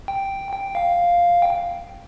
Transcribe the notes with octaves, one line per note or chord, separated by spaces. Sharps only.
G5
G5
F5
G5